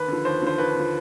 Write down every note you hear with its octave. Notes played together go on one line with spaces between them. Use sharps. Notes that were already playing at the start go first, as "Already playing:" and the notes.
Already playing: D#2 B4
D3 F3
D#2 C5
D3 F3 C5
D#2 B4
D3 F3